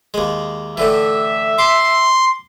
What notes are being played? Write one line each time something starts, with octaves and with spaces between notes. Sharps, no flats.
D#2 G#3
A2 D3 E3 E5
C6 D6